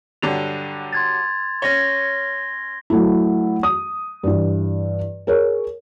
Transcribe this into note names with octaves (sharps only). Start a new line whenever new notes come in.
G2 D3 F#3 F7
C6 G#6 A6
C#4 C#5 G#6 A#6 G7
F#3 A3 E4
D#6
G2 E3
G#4 A#4 C#5